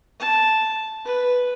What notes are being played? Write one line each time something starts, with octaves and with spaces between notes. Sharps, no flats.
A5
B4